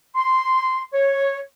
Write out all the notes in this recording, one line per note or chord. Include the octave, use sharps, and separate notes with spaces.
C6
C#5